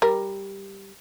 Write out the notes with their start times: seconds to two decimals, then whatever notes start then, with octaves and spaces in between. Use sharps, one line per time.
0.02 G3 A#4